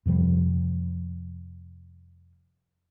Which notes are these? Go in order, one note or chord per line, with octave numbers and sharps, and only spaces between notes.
F2 C3 F3 G3